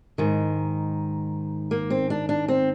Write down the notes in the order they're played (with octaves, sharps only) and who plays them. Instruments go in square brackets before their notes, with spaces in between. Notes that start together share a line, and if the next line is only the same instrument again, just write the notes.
[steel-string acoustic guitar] G#2 D#3
A#3
C4
D4
D4
C4